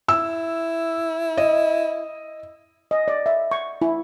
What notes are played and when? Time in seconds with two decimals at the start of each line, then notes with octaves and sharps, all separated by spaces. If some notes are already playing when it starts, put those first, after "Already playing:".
0.09 E4 E6
1.37 D#5
2.91 D#5
3.08 D5
3.26 E5
3.51 C#6
3.82 E4